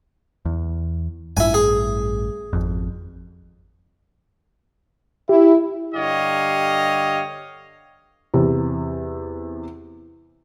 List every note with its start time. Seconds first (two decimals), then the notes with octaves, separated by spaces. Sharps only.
0.45 E2
1.37 A1 G2 E4 G#5
1.54 G#4
2.53 G#1 F2
5.29 E4 G4
5.95 G2 D3 G4 C#5 D#5 F5
8.34 E2 C3